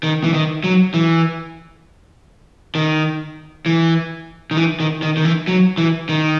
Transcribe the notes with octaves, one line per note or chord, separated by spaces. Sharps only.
D#3
E3
D#3
F#3
E3
D#3
E3
D#3
E3
D#3
D#3
D#3
E3
F#3
E3
D#3